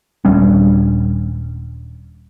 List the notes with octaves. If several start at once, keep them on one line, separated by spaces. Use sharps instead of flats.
D#1 G3 C#4 D4